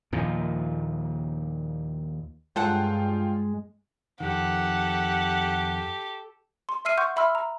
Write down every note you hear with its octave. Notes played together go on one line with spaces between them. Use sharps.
D#2 A#2 F3
G2 F#3 G#3 F4 A4 F#5 G5
F2 D#3 G4 A4 F#5
C6
E5 E6 F6 C7 D#7
F#5 C6 C#6 G6
E5 B5 C6 E6 F6
A#5